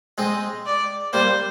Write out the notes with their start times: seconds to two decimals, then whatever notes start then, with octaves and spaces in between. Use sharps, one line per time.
0.18 G#3 C4 D#5
0.66 D5
1.13 G3 A#3 C5